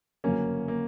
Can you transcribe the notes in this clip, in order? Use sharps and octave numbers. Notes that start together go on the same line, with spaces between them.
G1 F#2 C#3 F#3 A#3 C#4
A#3